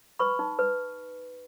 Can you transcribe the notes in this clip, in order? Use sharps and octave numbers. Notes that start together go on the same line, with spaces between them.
B4 B5 C#6
D#4
B4